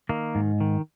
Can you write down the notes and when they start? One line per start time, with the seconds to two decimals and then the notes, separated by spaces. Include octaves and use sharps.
0.09 D#3 A#3
0.35 G#2
0.60 D#3